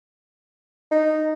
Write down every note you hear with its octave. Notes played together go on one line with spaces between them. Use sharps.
D#4